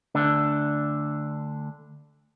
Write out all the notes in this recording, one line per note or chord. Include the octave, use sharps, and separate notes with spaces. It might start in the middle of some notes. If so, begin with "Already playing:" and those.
D2 D3 D4